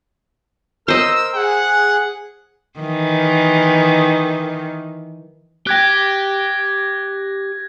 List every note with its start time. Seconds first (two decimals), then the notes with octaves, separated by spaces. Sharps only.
0.88 A#4 C5 D#5 E6
1.35 G#4 F#5
2.80 D#3 E3
5.67 G4 G5 F#6 G#6 A#6